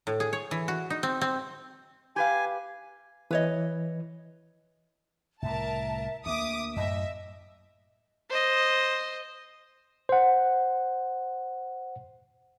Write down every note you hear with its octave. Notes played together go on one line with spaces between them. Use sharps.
A2
G#4
C#5
E3
F#4
D#4
C4
C4
G4 B4 F5 G#5
E3 B4 C#5 D#5
C2 A2 A#4 E5 A5
D2 A#3 E5 D6 D#6
F#2 A2 D#5 E5
C5 D#5
C5 F#5